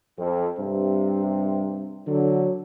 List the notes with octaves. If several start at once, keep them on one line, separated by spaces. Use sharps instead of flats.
F2
G2 C3
D3 F#3